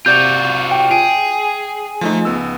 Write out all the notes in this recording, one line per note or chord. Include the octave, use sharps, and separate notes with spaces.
C3 F4 F#4 D5 G6 D7
G5
G#4 D7
F3 A3 D#4
C#2 B3 E6